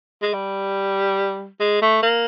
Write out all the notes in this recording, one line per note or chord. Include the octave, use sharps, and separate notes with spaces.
G#3
G3
G#3
A3
A#3